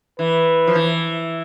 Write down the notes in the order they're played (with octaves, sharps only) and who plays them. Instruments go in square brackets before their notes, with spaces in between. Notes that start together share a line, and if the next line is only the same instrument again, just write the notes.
[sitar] E3 [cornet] B4
[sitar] F3
E3